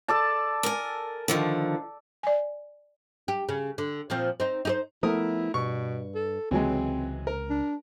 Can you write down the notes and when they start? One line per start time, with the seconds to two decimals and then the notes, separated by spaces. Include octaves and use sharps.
0.08 A4 D5 A5
0.63 A#4 G#5
1.28 D3 D#3 F3
2.23 D5 G#5
3.28 G4
3.49 C#3
3.78 D3
4.10 A#2 F3 C4
4.40 C4 D#4
4.65 D#4 G#4 C5
5.03 F3 A3 B3 E4 A#4 D#6
5.54 G2 B2 C#6
6.15 A4
6.51 C#2 C3 E3 F#3 G#3 C4
7.27 A#4
7.50 D4